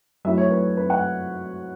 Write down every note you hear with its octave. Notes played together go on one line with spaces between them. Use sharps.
F#3 A3 E4 E5
C#5
B4
B4
F#5